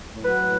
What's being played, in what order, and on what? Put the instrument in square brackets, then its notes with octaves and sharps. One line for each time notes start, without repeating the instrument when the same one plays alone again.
[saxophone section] A2
F#3 B4
A2